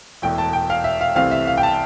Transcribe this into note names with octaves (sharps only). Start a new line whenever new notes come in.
E1 E2 E3 A3 G5
A5
G5
F5
E5
F5
C2 C3 E3 A3 C4 F5
E5
F5
G5
A5